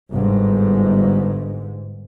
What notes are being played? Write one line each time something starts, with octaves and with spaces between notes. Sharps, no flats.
G1 G#2